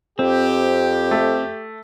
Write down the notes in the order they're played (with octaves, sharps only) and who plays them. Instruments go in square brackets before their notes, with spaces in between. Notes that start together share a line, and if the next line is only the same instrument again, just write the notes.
[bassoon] F2 [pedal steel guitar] C4 [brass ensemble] G4
[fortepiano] A3